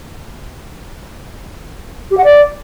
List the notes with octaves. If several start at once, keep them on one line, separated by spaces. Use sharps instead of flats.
G4
F#5
D5